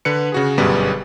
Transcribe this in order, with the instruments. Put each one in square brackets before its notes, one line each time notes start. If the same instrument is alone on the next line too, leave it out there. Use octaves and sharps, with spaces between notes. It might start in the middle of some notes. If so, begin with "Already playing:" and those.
[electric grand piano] D3 B4 C#7
C#3 F#4 G#4
G1 F#2 B2 G3 G#4 B4